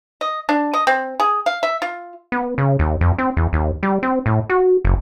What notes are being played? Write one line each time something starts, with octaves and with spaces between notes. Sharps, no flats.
D#5
D4
D#5
C4
G#4
F5
E5
F4
B3
C#3
D#2
F2
C4
E2
D#2
G3
C4
A2
F#4
F#1